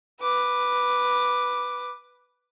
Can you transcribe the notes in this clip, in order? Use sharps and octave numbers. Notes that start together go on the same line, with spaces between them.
B4 D6